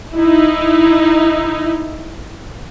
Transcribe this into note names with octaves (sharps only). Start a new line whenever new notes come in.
D#4 E4